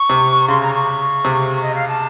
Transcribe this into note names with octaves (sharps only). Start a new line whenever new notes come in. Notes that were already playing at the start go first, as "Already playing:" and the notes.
Already playing: C#6
C3
C#3 C6
A#5
C#6
C3
D#5
F5
A5